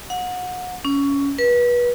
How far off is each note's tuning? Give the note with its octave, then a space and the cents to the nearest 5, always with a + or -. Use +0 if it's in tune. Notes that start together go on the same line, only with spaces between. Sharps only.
F#5 -30
C#4 +15
B4 -30